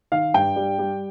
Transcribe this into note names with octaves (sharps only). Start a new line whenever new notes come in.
D#3 F5
G2 G5
G3
G3